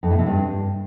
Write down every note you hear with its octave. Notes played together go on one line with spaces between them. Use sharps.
F2
A2
C3
G2